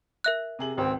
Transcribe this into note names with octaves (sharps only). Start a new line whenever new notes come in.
A#4 E5 F#6
C3 G#4 F#7
G#1 C#2 C4